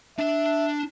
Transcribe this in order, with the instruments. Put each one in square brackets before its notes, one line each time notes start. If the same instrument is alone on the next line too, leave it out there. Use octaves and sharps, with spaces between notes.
[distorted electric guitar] D4 A5 [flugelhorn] E5